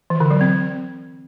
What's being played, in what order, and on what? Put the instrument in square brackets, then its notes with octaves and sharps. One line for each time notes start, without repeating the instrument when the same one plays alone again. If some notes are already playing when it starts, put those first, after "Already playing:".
[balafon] E3
D3
F#3
C4